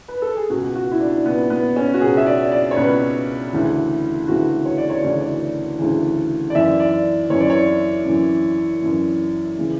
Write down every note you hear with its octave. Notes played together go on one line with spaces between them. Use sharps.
B4
A4
G#4
C#2 B2 F#4
F#4
E4
D4
C#2 B2 B3
B3
C#4
F#4
C#2 B2 G#4
E5
D5
D5
C#5
C#2 B2 B4
D2 C#3 E3
D2 C#3 E3 F#4
C#5
D5
C#5
D2 C#3 E3 D5
C#5
D5
D2 C#3 E3
D5
F#2 E3 E5
D5
F#2 E3 C#5
D5
C#5
F#2 E3
F#2 E3
C#3 E3